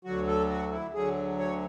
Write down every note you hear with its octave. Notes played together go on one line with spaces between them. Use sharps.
D2 D3 F#3 F#4
A4
F#4
E4
D2 D3 F#3 G#4
C#5